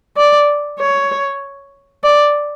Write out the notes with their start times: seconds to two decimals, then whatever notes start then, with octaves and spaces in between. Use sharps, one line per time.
0.17 D5
0.80 C#5
2.04 D5